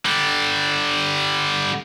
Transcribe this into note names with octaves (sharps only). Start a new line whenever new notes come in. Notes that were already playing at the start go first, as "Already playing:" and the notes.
D3 G3